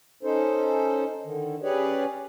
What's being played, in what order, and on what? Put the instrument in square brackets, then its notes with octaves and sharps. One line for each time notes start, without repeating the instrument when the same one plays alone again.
[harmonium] C#4 D#4 A4 C5
D3 D#3
C#4 G4 G#4 B4 C#5 D5